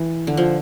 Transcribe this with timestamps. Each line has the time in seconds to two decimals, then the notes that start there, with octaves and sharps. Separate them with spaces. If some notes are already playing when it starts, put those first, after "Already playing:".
Already playing: E3
0.27 D3
0.37 F3